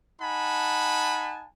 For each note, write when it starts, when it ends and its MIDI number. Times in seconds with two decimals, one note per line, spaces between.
0.22 1.47 63
0.22 1.47 78
0.22 1.47 80
0.22 1.47 81
0.22 1.47 83